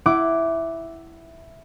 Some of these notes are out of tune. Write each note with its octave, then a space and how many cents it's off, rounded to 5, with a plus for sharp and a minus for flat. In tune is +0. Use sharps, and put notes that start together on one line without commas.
E4 +0 F#5 +25 D6 -5